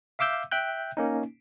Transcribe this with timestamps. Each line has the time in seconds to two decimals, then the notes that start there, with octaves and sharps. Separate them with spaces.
0.19 E5 F5 D6 E6 G6
0.52 E5 G5 F#6 G6
0.97 A#3 C#4 D#4